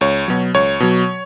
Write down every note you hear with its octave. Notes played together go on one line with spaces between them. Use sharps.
C#2 C#5
B2 F#3
C#2 C#5
B2 F#3